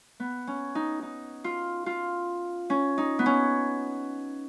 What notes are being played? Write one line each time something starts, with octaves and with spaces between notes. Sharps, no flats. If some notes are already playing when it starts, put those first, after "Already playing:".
B3
C#4
D#4
D#4
F4
F4
C#4
D#4
B3
C#4